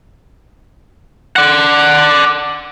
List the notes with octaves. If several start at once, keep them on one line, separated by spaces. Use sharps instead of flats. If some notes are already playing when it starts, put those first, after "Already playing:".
D5 F#5